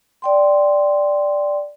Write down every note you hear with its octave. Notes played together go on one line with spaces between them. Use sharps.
D5 G5 C6